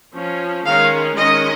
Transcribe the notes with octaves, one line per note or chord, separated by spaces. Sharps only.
F3 C#4
D#3 G#3 C#4 F5
D#3 G#3 C#4 D#5